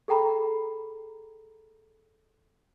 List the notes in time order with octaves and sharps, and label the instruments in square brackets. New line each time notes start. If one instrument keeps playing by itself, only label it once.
[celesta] G#4 A4 G5 A#5 B5